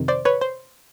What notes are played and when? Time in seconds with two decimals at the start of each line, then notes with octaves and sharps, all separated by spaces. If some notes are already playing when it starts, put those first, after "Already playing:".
Already playing: F2 C3 D#3
0.08 C5 D5
0.25 B4 C#5
0.41 C5